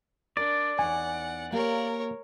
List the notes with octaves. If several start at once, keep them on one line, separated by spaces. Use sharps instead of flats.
D4 A#4 D5
E2 D#4 C#5 F#5 G#5
A#3 G4 A#4 C#5 F5